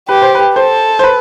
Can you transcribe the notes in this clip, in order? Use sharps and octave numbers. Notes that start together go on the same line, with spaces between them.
G4 B4
C5
B4
A4 C5
C5
B4